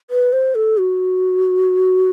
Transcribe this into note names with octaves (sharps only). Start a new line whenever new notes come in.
B4
C5
A4
F#4